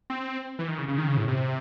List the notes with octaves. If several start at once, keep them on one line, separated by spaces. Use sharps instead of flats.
C4
E3
D#3
C#3
C#3
D#3
C#3
A2
C3